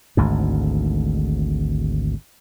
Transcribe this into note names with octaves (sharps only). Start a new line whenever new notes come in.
G#1 D2 G#2